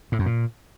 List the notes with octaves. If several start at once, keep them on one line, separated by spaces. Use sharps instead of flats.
A2
F#2
A#2